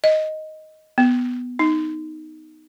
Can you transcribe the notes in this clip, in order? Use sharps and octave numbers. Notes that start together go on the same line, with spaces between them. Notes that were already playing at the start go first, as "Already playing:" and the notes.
D#5
B3
D#4